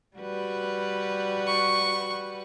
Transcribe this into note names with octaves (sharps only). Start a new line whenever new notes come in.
G3 F#4 B4
C#6